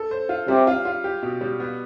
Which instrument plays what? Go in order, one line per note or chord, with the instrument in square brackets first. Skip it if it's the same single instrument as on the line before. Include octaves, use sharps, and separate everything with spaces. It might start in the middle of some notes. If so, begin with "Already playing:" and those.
Already playing: [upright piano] A4
C5
F4
[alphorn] C3 [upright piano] G3
[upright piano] F4
F4
G4
B2
G3
B3